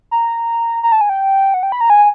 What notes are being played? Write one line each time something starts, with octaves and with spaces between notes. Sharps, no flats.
A#5
A#5
A5
G#5
G5
F#5
G5
B5
A#5
G#5